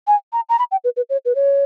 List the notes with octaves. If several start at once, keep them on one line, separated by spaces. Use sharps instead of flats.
G#5
A#5
A#5
B5
G5
B4
B4
C#5
B4
C#5